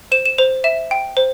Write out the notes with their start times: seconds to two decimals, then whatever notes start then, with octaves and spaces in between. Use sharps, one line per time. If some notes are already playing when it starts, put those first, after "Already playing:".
0.12 C5 E7
0.26 E7
0.38 C5 F7
0.64 E5 E7
0.91 G5
1.17 C5